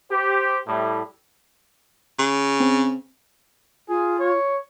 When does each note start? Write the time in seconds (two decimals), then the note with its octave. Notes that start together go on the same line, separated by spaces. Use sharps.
0.10 G4 C5
0.67 A2 G3
2.19 C#3
2.60 C4
3.89 F4 G#4
4.19 C#5